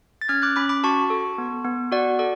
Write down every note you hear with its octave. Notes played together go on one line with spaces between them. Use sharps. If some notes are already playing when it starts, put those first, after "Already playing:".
A6
C#4 F6 G#6
D6 F#6
C#4 B5 D6
B5 D6
F#4 A5 C#6
A4
B3
B3
F#4 D5 F#5
A4 D5